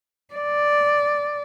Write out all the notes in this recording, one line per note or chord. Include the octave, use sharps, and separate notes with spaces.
D5